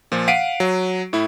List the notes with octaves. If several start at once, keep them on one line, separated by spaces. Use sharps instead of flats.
A#2 F3
F5 F#5 B6 C7 D7 D#7
F#3
A2 E4